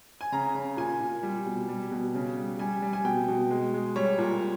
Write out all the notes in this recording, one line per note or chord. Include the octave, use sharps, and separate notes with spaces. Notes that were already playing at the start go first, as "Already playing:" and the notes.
G#5
C#3 A#5
C#3
A#2 G#5
A#2
G3
B2
G3
B2
C#3
G3
G3 G#5
G3
G#5
B2 G5
B2
G#3
G#3
G3 C#5
A#2